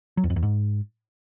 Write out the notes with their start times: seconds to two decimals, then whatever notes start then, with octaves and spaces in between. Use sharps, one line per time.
0.17 F#3
0.24 E2
0.30 F2
0.36 E2
0.42 G#2